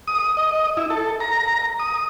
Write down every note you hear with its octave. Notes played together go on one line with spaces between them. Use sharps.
D#6
D#5
E4
A4
A#5
D#6